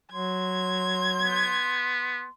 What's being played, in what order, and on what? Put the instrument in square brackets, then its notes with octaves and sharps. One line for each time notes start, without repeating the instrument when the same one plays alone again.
[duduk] F#3 [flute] C6 [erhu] G#6
[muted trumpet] B3